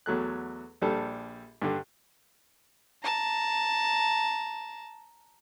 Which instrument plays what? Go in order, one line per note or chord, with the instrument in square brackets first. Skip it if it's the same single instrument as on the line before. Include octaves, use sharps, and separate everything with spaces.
[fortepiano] E2 F#3 A3 F#6
A#1 G3 D4 A4 A5
G2 D3
[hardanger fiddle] A5 A#5